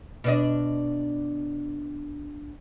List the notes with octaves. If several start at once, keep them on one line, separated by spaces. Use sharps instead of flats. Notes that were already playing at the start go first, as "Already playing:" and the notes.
B2 D4 D#5